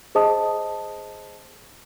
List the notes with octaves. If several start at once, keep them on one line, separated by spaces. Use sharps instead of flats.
G#4 C5 D#5 A5 D#6